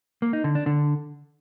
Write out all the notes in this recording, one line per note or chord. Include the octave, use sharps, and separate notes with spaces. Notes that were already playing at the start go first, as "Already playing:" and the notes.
A#3
D#4
D3
D4
D3